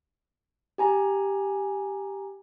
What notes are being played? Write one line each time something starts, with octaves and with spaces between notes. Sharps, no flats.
G4 G#5 A#5